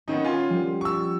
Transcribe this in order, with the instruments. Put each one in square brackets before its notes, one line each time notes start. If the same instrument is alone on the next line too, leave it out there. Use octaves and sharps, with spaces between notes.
[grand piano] D#3 D#4 [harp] B3 C#4
[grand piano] F4 G#5 C6 [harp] C7
[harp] F3 G3
[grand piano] C#6 E6